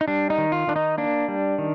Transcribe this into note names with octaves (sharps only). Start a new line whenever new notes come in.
D#4
G3 D4
D#4
D#3
F4
D#3 D4
D#4
A#3 D4
G3
D#3